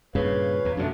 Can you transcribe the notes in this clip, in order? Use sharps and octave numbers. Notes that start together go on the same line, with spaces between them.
G2 A#2 C#3 B4 C#5 F5
E2
F#2 B2 D3 A3 D4